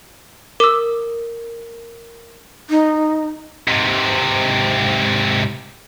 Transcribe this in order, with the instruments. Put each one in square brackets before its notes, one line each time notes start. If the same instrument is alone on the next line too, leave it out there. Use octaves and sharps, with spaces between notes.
[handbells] A#4 [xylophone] D6 E6
[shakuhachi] D#4
[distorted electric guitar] G#2 C3